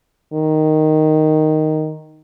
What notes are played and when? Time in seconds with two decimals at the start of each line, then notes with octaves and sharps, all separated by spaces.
0.33 D#3